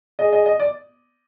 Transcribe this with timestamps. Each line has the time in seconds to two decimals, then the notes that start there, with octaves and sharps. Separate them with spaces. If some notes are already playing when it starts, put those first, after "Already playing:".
0.19 G#4 D#5
0.33 D#5
0.46 D#5
0.60 D5